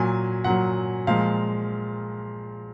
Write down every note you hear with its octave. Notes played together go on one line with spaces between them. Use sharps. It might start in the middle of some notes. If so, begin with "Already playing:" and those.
Already playing: A#2 F#3 G#5
A#2 F#3 F#5
A#2 F3 G#3 F5